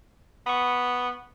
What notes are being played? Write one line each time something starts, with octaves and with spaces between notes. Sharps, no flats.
B3 B5 C#6